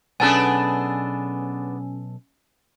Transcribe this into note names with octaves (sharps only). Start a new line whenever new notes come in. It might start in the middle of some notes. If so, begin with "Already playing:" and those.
B1 B3 C#4 D4 G#4 A4 G#5